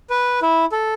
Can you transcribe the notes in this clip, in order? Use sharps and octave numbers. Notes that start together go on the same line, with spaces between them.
B4
E4
A4